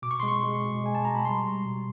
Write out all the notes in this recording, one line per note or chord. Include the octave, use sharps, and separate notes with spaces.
B2 D6
C#6
G#3 C6
C#6
G#3
B2
G#3 G#5
A5
B2 A#5
B5
G3 C6
G3
B2